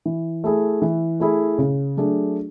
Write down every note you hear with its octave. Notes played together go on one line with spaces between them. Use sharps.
E3
A3 E4 G#4
E3
A3 E4 G#4
C#3
F#3 A3 D4 G#4